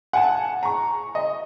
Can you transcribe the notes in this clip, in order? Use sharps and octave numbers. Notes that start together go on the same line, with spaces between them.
F#5 G#5 A5
A#5 C#6
D#5